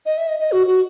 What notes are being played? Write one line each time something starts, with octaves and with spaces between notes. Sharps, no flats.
D#5
E5
D#5
D#5
F#4
F#4